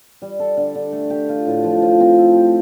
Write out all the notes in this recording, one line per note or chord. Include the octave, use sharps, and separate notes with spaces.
G3
A4
D3
D3
A3
G4
F4
A2
F3
F3
C4
A4
G4